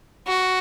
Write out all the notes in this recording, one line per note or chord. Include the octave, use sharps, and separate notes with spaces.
F#4